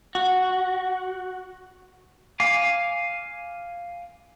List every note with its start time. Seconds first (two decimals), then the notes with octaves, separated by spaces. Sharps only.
0.15 F#4
2.40 F5 G#5 D6